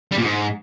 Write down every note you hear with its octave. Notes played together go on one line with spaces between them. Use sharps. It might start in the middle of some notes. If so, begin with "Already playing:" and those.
G3
A#2
G#2